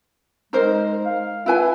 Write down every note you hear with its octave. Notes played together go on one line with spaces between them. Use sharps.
G#3 D#4 A#4 C5
F5
E4 F4 B4 G#5